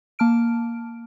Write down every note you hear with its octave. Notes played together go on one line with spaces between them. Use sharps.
A#3 A5 F6 D7